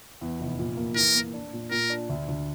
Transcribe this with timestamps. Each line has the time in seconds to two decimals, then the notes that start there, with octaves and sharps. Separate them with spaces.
0.21 E2
0.40 F1
0.59 A#2
0.77 A#3
0.96 E3 A#4
1.15 A#3
1.33 D4
1.53 A#2
1.71 A#2 A#4
1.90 D4
2.09 D2
2.28 D2